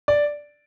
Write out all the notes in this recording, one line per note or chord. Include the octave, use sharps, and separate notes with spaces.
D5